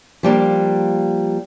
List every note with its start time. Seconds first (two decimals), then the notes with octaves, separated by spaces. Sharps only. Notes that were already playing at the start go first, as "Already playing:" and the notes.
0.23 F3 G3 A#3 D4